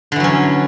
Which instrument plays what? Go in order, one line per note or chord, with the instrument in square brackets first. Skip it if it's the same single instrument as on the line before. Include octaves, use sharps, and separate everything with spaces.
[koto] D3
E3
F#3
C#4